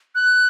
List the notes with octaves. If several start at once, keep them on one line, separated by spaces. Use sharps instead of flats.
F#6